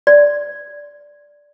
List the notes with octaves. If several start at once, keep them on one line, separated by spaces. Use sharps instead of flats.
D5